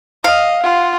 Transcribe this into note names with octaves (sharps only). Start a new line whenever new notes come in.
D#5 F5
F4 F#5